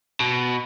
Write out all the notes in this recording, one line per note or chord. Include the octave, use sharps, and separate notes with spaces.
B2